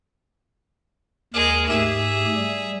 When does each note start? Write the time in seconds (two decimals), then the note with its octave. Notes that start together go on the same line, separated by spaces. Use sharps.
1.34 D#2 G#3 G#4 A#4
1.69 G#2 A3 G4 G#4 E5
2.36 G3